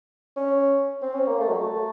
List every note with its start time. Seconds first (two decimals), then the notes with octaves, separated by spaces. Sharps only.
0.36 C#4
1.02 C4
1.15 C#4
1.27 A#3
1.40 A3
1.49 F#3
1.57 A3